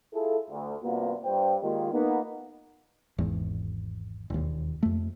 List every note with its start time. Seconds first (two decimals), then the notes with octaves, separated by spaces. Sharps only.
0.14 E4 F4 G#4 A4
0.50 D2
0.83 G2 C3 A#3 B3 F4 F#4
1.25 G2 C5 G5
1.63 D#3 G#3 A#3 F4 G4
1.92 A#3 B3 D#4
3.18 G#1 E2
4.30 E1 D#2
4.83 F2 A3